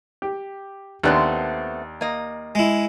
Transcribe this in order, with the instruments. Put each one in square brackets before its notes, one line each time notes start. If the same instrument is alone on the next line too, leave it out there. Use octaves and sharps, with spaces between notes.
[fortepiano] G4
[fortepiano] D#2 D4 F#6 [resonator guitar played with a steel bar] A3 B3 C4
[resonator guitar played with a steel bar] A#3 D#5
[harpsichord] G#3 E4